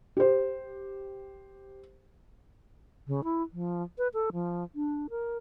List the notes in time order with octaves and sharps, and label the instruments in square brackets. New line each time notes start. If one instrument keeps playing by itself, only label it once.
[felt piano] G4 C5
[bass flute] C#3
E4
F3
B4
A4
F3
D4
A#4